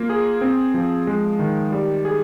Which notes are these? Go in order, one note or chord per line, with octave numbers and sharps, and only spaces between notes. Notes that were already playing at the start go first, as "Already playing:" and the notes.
Already playing: A#3 F4
G#4
C4
F3
G#3
D#3
G3
G#4